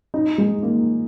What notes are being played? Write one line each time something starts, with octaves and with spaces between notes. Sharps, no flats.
D#4
G#3
A#3